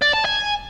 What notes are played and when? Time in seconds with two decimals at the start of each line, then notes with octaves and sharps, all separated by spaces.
0.02 D5
0.13 A5
0.25 G#5